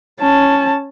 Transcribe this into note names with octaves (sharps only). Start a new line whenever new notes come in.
C#4 A5